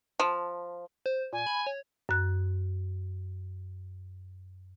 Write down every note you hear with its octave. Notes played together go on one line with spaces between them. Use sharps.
F3
C5
A#2 G#5
B5
C#5
F#2 F#6